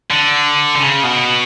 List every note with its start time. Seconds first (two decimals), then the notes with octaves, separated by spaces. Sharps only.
0.10 D3
0.76 D3
0.80 C#3
1.04 B2